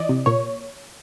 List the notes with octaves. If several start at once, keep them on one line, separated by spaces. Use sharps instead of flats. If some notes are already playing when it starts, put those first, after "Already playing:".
Already playing: E3 D5 D#5
C3
A#2 C#5